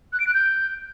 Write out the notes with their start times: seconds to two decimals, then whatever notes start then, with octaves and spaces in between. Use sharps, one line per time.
0.13 F#6
0.20 D7
0.27 F#6
0.34 G6